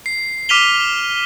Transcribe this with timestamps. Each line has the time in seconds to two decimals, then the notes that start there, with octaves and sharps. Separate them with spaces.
0.06 C7
0.49 D6 F6 B6 D#7 F7 G7